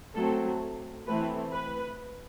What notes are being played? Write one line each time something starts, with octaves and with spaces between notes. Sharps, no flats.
F#3 A3 C4 A4
E3 A3 C4 B4
B4